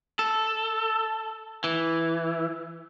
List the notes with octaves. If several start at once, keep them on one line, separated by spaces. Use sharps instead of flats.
A4
E3